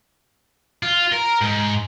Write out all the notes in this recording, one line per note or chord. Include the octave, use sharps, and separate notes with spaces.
F4
A#4
G#2